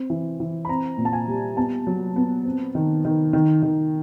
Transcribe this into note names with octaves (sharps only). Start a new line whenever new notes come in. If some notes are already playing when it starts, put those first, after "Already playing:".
Already playing: C4
E3
E3
B5
C4 A#5
A#2
A5
G#5
G3
B3 A5
F#3
B3
C4
D#3
D#3
D#3
D#3